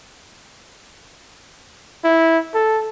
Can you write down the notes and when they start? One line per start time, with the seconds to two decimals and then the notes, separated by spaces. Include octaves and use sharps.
2.04 E4
2.55 A4